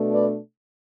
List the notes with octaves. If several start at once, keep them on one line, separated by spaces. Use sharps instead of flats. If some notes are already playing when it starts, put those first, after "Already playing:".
Already playing: B2 A3 D4
B4 D5